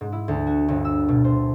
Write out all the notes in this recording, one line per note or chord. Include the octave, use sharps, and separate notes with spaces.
G#2
E4
D2
F#4
G1
E6
B2
C5